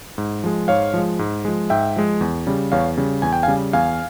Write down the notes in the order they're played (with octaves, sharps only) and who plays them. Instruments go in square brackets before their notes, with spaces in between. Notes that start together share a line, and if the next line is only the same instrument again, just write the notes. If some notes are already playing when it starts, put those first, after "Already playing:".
[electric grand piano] G#2
F3 G#3
G#2 C#5 F5
F3 G#3
G#2
F3 G#3
G#2 E5 G5
F3 G#3
E2
C#3 G3
E2 C#5 F5
C#3 G3
E2 G#5
G5
F5 G#5
C#3 G3
E2 F5 G#5